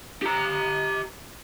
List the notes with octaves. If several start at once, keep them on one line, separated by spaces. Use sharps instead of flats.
G4 A#5